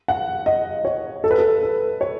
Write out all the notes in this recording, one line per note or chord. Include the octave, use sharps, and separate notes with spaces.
F#5
D#5
C#5
A4
B4
A4
A4
C#5